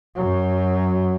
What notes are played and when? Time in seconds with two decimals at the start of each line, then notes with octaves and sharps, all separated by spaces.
0.15 F#2 F#3